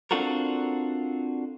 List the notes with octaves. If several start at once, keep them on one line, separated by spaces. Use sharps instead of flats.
C4 D4 F4 F#4 A4 A#4